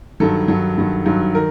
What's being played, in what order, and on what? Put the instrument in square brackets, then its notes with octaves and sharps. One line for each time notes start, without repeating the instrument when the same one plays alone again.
[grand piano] G2 D#3 F#3 A4
G2 D#3 F#3
G2 D#3 F#3
G2 D#3 F#3
D#3 A#4